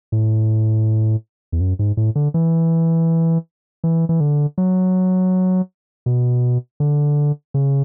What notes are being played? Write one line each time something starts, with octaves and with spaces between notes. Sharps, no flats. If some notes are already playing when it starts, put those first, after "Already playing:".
A2
E2
F#2
G#2
A2
D3
E3
E3
E3
D3
F#3
B2
D3
C#3